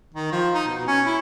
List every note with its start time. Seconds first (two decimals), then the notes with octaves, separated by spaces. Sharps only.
0.14 D#3
0.32 F3
0.55 D#4
0.68 B2
0.87 C#4
1.06 E4